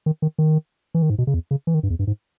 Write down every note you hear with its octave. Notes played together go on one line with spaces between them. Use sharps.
D#3
D#3
D#3
E3
D#3
G#2
B2
C#3
E2
C#3
E3
D#3
G2
E2
G2
G#2